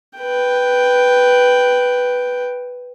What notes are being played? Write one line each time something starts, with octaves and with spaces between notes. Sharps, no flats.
B4 G5